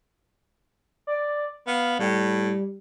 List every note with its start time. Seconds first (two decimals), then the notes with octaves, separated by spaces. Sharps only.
1.07 D5
1.67 B3 F5
1.99 A2 G3